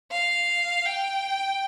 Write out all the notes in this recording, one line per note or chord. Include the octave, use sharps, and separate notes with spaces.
F5
G5